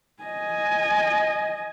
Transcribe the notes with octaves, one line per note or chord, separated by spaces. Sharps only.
D#5 G#5